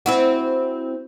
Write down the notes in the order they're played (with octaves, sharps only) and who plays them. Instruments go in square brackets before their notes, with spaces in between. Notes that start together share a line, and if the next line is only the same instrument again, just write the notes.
[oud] C4 E4 F#4